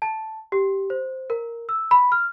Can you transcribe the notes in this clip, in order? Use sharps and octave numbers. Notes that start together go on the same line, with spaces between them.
A5
G4
C5
A#4
E6
B5
F6